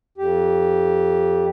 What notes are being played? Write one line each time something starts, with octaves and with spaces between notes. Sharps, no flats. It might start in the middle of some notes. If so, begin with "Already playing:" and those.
F2 G4